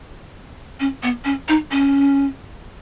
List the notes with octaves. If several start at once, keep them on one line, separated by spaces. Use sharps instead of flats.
C#4
B3
C#4
D#4
C#4